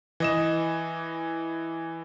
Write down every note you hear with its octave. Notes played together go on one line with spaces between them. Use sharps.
E3 D#5 E7